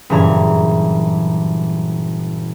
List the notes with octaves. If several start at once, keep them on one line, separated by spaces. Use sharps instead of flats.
F#1 G2 A#2 E3 A#5 G#6